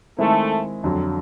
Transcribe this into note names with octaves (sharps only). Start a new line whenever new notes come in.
D#3 G#3 A3 C4 E4
F2 D3 F#3